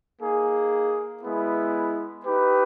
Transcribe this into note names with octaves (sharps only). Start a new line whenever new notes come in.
A#3 D#4 G#4
G#3 B3 E4
D#4 G4 B4